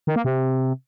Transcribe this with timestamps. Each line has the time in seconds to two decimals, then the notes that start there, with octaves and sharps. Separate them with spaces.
0.07 D#3
0.16 A#3
0.25 C3